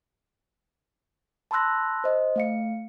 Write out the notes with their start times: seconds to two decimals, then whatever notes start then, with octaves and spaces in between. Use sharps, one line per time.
1.51 A5 B5 C6 E6 F#6 A#6
2.04 C5 D#5
2.36 A3 F5 C#7